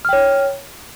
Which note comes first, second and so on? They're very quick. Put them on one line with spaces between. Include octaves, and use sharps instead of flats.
F6 G5 C#5